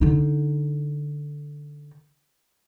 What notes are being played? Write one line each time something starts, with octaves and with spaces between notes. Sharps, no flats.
D3 D#4